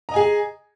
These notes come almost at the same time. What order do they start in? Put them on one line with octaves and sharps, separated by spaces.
A#5 D#5 G#5 G#4